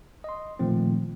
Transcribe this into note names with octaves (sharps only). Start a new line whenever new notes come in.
D#5 C6
A#2 D#3 F3 A3 C4